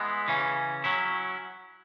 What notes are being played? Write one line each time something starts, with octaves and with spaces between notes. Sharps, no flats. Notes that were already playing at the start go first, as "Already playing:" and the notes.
Already playing: G#3 B3 E4
C#3 E3 C#4
F#3 C#4 E4